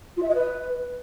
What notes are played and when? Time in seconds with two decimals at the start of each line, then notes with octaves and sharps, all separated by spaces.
0.16 F4
0.22 E5
0.28 D#5
0.34 B4